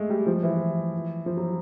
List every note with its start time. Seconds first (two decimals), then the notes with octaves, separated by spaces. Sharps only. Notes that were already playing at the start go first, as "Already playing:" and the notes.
Already playing: G#3 A3
0.10 G3
0.27 F3
0.43 E3
1.26 F3
1.37 F#3